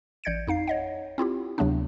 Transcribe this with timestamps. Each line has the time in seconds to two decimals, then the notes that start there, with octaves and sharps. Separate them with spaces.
0.24 A1 D5 G6 G#6 C#7 D7
0.47 F2 D#4 F5 C7
0.67 C#5 D#5 F#5
1.18 C4 E4 F4 G4
1.58 D2 C3 F#3 A3 B3 D4